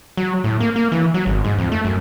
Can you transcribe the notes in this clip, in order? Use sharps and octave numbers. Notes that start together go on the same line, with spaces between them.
F#3
A2
A#3
A#3
E3
F#3
G#1
G#2
F2
A3
F#2